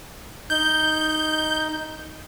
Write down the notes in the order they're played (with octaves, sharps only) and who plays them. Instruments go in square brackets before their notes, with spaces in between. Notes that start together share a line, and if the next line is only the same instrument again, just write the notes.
[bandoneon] D#4 [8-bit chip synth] G6